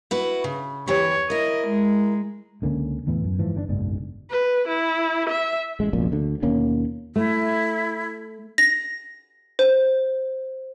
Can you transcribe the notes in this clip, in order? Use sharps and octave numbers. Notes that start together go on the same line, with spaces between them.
E4 F#4 B4
C#3
E2 E3 G4 C#5
E4 A#4 D#5
G#3
C#2 D3 A#3 C#4
E2 A2 E3 B3
F#2
G#2 E3 F3
G1 C#3 D4
F#1 B1 G#2 D4
B4
E4
E5
A1 G#3
F1 A#1 F#2 A#2
D2 D3
D#2 B2 A#3 C#4
A3 E4
A#6
C5